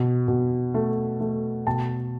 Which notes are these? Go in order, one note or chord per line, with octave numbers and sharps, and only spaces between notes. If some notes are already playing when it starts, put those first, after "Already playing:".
Already playing: B2
B2
A3
A3
B2 A5